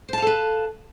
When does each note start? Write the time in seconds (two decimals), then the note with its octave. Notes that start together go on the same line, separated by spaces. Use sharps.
0.09 C5
0.13 A5
0.18 F5
0.22 A4
0.27 B4